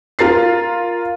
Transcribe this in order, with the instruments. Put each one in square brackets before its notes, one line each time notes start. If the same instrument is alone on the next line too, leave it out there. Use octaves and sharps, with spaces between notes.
[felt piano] F4 A#4 A6 C7